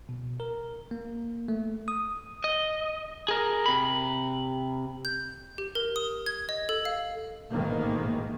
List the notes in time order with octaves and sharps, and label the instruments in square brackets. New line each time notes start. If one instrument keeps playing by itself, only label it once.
[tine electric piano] B2
A#4
A#3
A3
D#6
[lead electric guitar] D#5
G#4 A#4
C3 B5
[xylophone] G6
G4
A#4
D#6
G#6
D#5
A4
F5
[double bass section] A1 G#2 B2 D#3 E3 A#3